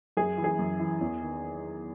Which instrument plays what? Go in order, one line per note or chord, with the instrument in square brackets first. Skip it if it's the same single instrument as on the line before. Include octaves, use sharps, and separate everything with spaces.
[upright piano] F#2 G#4
E3
G#4
F#2
E3
E2
D#3